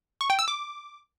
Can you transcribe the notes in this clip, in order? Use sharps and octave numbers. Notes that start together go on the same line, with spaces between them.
C#6
G5
E6
D6